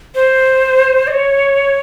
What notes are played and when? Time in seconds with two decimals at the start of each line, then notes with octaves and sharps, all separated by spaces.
0.15 C5
1.07 D#5
1.11 C#5